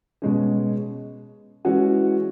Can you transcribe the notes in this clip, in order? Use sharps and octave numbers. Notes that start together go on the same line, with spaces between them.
B2 G#3 C#4
E3 G#3 C#4 F#4